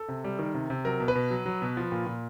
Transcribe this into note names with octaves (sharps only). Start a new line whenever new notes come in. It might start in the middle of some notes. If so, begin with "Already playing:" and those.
Already playing: A4
C3
G3
D#3
C3
C3
F#3 A#4
B2
B4
B2
F#3
F#3
B2
F3
A#2
A#2